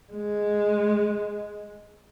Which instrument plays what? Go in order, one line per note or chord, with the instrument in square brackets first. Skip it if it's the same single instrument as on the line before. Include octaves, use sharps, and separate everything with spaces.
[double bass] G#3